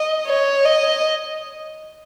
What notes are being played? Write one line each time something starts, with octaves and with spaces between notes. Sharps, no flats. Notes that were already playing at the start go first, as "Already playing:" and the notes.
Already playing: D#5
C#5
D#5